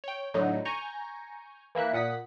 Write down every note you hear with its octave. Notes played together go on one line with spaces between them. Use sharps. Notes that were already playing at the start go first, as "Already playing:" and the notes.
C#5 G5
A2 D3 F#3 D#4
G#5 A#5 C#6 G6
E3 A#3 E5 F#6
A#2 F#5 D#6 B6